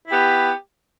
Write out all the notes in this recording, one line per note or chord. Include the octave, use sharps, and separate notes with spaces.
B3 E4 G4